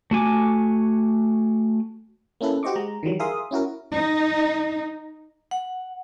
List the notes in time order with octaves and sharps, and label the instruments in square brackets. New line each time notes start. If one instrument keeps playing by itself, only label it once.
[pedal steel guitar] A3 F#4 G#5 D6
[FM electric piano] A#3 C#4 E4 A4 B4
F#4 G4 C5 D#5 C#6 D6
G#3 A#5
D#3 E3 F#3 G3
G#4 A#4 E5 F5 C6 D#6
C#4 E4 F#4 A#4
[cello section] D#4
[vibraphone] F#5